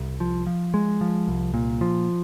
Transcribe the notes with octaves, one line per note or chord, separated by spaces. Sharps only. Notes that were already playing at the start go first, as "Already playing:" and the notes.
Already playing: C2
F3
F3
G#3
F3
C2
A#2
F3